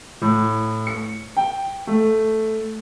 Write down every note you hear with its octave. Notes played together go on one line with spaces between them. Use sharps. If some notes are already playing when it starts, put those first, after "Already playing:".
A2
C#7
G5
A3